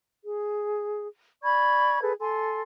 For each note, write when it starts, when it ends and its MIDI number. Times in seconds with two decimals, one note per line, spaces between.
0.24 1.05 68
1.44 2.01 74
1.44 2.01 83
1.44 2.01 85
1.44 2.01 92
2.01 2.13 68
2.01 2.13 69
2.01 2.13 71
2.20 2.62 69
2.20 2.62 80
2.20 2.62 84